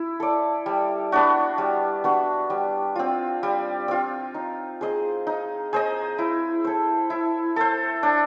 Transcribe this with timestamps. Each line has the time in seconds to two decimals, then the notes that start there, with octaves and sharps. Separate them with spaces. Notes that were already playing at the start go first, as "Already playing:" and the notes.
Already playing: E4
0.20 A4 D5
0.66 G3
1.12 B3 D4 F#4
1.58 G3
2.04 B3 D4 F#4
2.50 G3
2.96 C4 F4
3.43 G3
3.88 C4 F4
4.34 D#4
4.81 G#4 C5 D#5
5.27 D#4
5.73 G#4 C5 D#5
6.18 E4
6.64 A4 C5
7.10 E4
7.56 A4 C5
8.03 D4